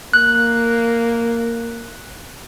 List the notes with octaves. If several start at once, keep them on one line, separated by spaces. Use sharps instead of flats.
A#3 F#6